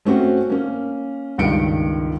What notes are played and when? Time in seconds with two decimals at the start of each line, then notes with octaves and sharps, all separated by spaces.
0.05 A3 C4 C#4 F#4
0.50 A#3 C#4
1.38 C#2 G2 D#3 C#7 D7